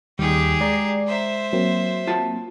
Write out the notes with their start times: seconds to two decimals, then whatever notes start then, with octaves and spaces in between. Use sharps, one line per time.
0.19 D#2 D#3 G3 G4 G#4
0.61 G#3 D5 A#5 C7
1.07 C5 E5
1.53 F#3 A#3 C4
2.07 F4 F#4 A5